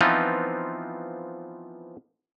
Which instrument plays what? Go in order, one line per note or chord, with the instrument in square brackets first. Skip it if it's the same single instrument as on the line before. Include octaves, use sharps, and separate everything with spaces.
[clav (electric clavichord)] E3 F3 B3 C4 D#4 F4